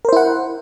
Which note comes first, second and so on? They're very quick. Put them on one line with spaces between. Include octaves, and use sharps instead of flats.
A#4 C5 E4 F#5